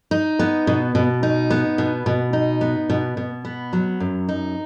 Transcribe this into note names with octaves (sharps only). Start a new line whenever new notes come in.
D#4
B3
B2
B2
D#4
B3
B2
B2
D#4
B3
B2
B2
B3
F#3
F#2
D#4